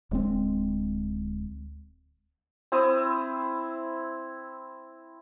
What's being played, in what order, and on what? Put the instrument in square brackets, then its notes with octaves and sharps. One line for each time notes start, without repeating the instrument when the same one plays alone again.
[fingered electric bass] D1 G#3 C4
[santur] C4 E4 D#6